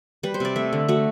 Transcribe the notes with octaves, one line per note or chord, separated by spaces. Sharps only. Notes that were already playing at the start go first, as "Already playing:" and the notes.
G3 B4
C5
C3 D5
A3 E5
D3
A3 F#4